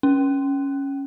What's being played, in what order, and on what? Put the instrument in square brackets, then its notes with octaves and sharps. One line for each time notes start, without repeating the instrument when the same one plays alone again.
[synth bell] C#4